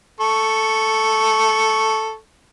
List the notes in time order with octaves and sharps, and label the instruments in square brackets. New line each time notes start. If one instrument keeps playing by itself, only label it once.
[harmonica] A4 C#6